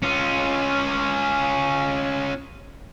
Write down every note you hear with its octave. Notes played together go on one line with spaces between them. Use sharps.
C#4 F4